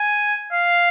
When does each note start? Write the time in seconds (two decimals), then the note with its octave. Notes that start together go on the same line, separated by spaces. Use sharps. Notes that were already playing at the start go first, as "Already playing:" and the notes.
Already playing: G#5
0.52 F5